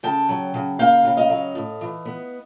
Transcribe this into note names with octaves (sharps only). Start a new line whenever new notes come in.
C#3 G5 A5
F#3
C#3
A#3 F5 G5
C#3
D#5 F5
F#3
A2
E3
B3